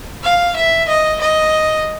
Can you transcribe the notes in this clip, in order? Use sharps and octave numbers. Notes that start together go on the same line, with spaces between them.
F5
E5
D#5
D#5